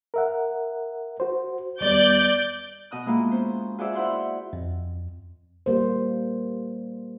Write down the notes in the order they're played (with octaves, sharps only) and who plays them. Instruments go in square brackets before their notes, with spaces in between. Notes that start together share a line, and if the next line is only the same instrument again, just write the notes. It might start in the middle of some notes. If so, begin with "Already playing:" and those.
[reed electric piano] A#4 E5 F#5
F#4 C5
[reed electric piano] D#2 G3 B3 [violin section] D5 G6
[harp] B2 D#5 D#6 F#6
G#3 A#3 B3 E4 F4
C#4 C5
F4 F#4 G#4 C5 D5 E5
E4 C5 F#5 C6
[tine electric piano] F2
[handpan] G3 A#3 C5